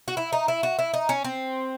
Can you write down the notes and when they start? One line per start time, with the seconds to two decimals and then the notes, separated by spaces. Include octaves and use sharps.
0.08 F#4
0.17 E4
0.33 D#4
0.48 E4
0.63 F#4
0.79 E4
0.94 D#4
1.09 C#4
1.25 C4